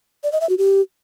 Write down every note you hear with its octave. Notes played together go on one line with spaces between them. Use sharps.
D5
D#5
E5
F#4
G4